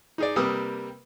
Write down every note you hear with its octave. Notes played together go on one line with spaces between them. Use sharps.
D#4 G#4 D5
C3 G3 A#3 B4 D#6 E6